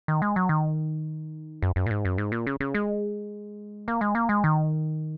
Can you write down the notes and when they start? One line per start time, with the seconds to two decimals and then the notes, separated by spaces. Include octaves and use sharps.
0.08 D#3
0.22 G#3
0.36 F#3
0.49 D#3
1.62 F#2
1.76 F#2
1.86 A#2
1.91 G#2
2.05 F#2
2.18 G#2
2.32 A#2
2.47 C#3
2.60 C#3
2.74 G#3
3.88 A#3
4.01 G#3
4.15 A#3
4.29 G#3
4.44 D#3